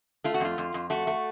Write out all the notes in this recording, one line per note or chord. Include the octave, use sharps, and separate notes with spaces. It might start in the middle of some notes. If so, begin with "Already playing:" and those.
A3 F4
F#4
F2 F4
F2
F2
A3 F#4
A3